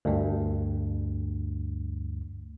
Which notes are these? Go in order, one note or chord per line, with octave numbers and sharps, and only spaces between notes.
D2 G2